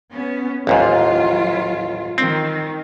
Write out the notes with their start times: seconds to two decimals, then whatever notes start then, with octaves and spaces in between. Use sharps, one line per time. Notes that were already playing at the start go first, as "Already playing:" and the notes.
0.11 B3 C#4
0.67 A1 D#2 G#2 F#3 F4
2.18 D#3 C4